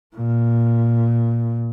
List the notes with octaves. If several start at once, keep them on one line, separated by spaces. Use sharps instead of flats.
A#2